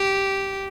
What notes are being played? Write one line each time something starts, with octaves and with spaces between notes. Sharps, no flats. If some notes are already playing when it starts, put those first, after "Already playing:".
Already playing: G4